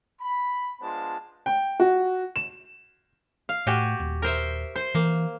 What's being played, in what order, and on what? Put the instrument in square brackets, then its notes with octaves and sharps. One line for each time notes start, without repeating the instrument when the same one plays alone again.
[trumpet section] B5
G#3 B3 D4 F4 C5 A5
[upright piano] G5
F#4
E7
[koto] F5
[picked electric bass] A2 [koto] F#4 G4 G#5
[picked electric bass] D#1
[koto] A#4 C5 E5
C5
[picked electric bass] E3 [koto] A#3